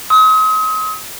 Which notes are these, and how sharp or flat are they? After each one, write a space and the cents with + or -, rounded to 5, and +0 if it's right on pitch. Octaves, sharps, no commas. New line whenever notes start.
C6 +0 D#6 +40